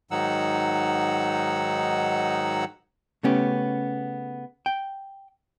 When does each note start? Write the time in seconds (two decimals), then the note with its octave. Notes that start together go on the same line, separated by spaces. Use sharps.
0.11 G#2 D#3 F#3 D#4 F#5 E6
3.23 C#3 A3 B3 C#4 G4
4.66 G5